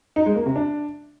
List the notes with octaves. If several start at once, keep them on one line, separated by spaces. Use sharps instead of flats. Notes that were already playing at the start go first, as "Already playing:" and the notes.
D#4
G#3
A#3
C3
D4